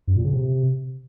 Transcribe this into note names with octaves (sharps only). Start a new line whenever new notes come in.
F#2
A#2
C#3
C3